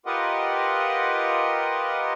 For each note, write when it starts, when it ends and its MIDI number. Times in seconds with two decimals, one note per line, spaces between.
0.06 2.14 65
0.06 2.14 67
0.06 2.14 70
0.06 2.14 71
0.06 2.14 75
0.06 2.14 78